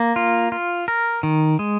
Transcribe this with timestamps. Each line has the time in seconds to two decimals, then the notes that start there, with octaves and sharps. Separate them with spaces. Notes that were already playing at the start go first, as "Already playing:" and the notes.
Already playing: A#3
0.16 F4
0.52 F4
0.88 A#4
1.23 D#3
1.59 G#3